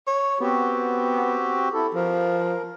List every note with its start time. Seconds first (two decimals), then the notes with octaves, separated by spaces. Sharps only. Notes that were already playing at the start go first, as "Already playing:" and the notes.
0.07 C#5
0.41 B3 C4 F#4 G4
1.73 E4 A4
1.95 F3 A#4